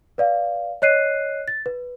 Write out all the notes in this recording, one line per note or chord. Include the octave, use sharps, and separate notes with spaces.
B4 D5 F5
C#5 D#5 F#6 C7 D#7
A6
B4